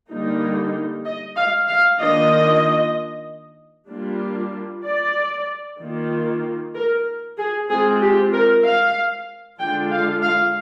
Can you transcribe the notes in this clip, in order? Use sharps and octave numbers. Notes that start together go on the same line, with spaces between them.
D3 G3 A#3 D#4
D#5
F5
F5
D#3 A#3 D4 F4 D#5
G3 A#3 D4 F4
D5
D#3 A#3 F4
A#4
G#4
G#3 C4 F4 G#4
G4
A#4
F5
D3 G#3 D4 F4 G5
F5
F5